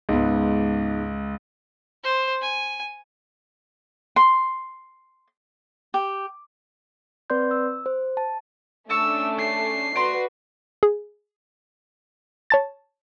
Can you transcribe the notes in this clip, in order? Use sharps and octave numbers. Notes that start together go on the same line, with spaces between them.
C#2 G#2 B3
C5
G#5
C6
G4
C4 B4 D5 C6 G6
E6
C5
A5
A3 C#4 D4 A5 C#6 E6
C7
F#4 B4 D5 A#5 C6
G#4
C#5 A5 A6